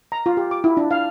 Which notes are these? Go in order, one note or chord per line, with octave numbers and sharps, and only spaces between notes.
A#5
F4
G4
D6
E4
D4
F5